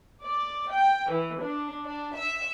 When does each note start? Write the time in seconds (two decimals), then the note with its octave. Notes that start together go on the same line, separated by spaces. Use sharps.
0.22 D5
0.72 G5
1.11 E3
1.42 D4
1.86 D4
2.16 E5